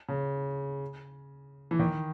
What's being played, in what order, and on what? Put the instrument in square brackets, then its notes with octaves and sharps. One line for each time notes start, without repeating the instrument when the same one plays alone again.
[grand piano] C#3
E3
D#3